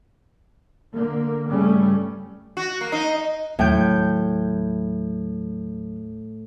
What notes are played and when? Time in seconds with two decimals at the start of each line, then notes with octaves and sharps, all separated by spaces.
0.93 D3 A#3
1.46 G2 C#3 G3 A3 C#4
2.57 F#4
2.81 A#3
2.92 D#4
3.59 D#2 A2 F#3 G5 G6